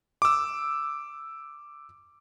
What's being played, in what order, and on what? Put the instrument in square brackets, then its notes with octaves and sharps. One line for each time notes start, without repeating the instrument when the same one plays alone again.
[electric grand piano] D6 E6